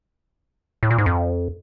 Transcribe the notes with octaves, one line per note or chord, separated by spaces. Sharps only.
A2
A#2
G#2
F2